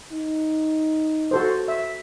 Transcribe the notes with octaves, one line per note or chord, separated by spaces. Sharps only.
D#4
F#4 A4 C5
E5